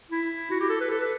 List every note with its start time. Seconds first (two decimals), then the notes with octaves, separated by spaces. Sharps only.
0.10 E4
0.50 F#4
0.60 G4
0.69 A4
0.80 B4
0.91 A4
1.01 B4